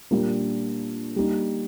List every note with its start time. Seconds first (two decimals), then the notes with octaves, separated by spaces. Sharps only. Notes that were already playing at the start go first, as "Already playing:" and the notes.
0.11 A#2 G3 D4 F4 A#4
1.16 G3 A#3 D#4